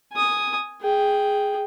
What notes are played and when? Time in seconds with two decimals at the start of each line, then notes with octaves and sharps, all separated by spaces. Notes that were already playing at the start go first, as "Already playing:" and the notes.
0.13 G#5 D#6
0.81 G#4 G5